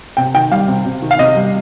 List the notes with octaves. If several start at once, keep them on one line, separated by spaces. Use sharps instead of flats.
C3 G5
D#3 G5
G3 F5
C3
C3
D#3
F5
C3 D#5
G3